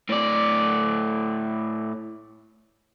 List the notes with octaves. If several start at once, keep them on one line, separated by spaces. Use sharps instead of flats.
A2 D5